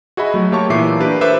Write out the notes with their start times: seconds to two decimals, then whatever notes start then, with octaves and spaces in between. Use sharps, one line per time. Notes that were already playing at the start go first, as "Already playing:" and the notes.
0.17 F#4 G#4 D#5 E5 B5
0.34 F#3 A3
0.52 A#3 G4 C#5 A5 C#6
0.70 A#2 E3 B4 E5 D6 C7
1.00 D4 G4 A#4 B4
1.21 A4 B4 C5 E5 D6